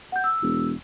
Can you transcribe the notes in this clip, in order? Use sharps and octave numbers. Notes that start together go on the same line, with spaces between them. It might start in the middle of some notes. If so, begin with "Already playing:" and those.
F#5 G6
E6
E1